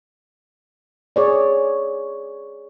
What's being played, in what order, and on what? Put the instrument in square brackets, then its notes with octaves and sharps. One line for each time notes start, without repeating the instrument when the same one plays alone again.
[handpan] G#4 C#5 D5